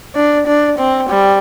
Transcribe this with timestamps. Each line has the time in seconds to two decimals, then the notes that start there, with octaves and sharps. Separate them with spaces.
0.15 D4
0.47 D4
0.78 C4
1.09 G3